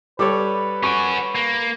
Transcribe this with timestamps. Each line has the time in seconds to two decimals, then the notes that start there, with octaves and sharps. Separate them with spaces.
0.19 G3 A4 B4 C#5 D6
0.83 C#4 F#4 C#6 D7
1.35 A#3